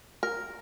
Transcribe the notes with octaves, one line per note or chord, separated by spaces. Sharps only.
A#4